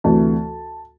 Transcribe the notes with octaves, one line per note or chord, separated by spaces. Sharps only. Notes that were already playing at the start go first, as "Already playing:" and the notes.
D2 C3 E3 A3 A5